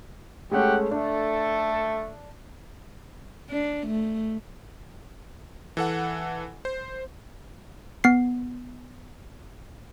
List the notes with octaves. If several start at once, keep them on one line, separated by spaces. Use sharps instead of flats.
G#3 A3 C#4 G4 F#5
A3 D4 A4
D4
A3
E3 A4 F#5
C5
B3 C7